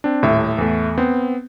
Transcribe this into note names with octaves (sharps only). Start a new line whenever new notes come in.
C4 D4
D#1 A2 E5
E2 A3
B3 C4